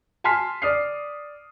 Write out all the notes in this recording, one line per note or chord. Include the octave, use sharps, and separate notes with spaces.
G#5 A5 C6 F6 B6 C7
D5 D#6 F6 C7